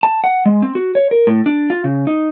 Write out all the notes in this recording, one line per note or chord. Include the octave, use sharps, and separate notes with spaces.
A5
F#5
G#3
C4
F#4
C#5
A#4
A2
D4
F4
C#3
D#4